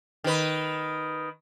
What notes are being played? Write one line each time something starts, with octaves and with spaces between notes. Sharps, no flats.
D#3 B4